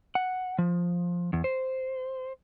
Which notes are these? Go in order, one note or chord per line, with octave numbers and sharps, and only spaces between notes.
F#5
F3
E2
C5